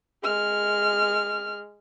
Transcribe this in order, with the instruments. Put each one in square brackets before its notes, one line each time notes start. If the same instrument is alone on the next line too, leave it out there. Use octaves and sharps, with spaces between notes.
[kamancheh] G#3 F6